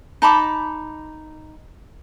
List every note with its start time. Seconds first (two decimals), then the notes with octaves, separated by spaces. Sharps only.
0.22 D#4 A5 B5 D6